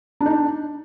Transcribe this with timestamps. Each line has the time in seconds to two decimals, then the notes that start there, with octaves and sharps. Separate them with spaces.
0.21 D4
0.26 D#4
0.31 D4